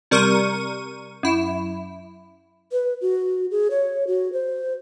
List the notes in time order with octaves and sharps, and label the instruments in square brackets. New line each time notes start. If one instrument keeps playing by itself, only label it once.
[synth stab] C3 G3 A#4 C#6 D#7
F#2 E4
[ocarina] B4
F#4
G#4
C#5
F#4
C5